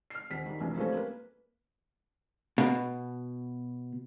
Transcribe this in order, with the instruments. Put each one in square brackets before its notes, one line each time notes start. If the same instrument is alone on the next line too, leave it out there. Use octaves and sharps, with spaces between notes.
[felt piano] F6 C7
D#1 B6
D#3 G3
F1 A#1 E3
F3 G3 A3 C4 C#4
A#3 B4
[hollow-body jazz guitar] B2